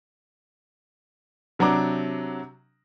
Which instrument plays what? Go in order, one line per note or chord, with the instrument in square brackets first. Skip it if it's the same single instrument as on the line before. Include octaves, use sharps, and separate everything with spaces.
[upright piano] C3 F#3 D4 A#5 D6